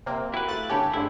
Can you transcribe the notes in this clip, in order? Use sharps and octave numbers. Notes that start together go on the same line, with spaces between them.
C3 A#3 C4
E4 F#4 G4 A#4 B4 G5
A3 F5 F#6 A6
D3 G4 A4 C#5 G#5 A5 B5
G2 D3 G#3 A3 C4 E4